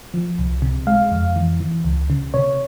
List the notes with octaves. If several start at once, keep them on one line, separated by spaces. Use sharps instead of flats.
F3
C2
C3
G#3 F5
F2
E3
E3
C#2
C#3
C3 C#5